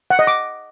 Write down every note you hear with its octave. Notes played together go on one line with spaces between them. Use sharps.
F#5
D#5
D6